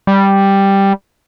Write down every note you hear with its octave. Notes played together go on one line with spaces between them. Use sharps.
G3